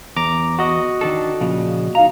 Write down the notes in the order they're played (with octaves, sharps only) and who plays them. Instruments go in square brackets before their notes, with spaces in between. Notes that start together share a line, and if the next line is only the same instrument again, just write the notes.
[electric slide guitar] E2 [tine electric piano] A#5 D6
[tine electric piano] F#4 D#5
[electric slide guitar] D#3 D4 A4
A#2 C#3 F3
[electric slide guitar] D#4 A#5 [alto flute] F5